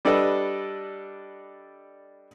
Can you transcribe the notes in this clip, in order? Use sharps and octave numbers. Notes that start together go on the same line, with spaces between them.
G3 D4 A4 B4 D#5